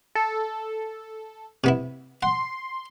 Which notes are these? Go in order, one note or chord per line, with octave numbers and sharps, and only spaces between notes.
A4
C3 B3 E4
F#5 C6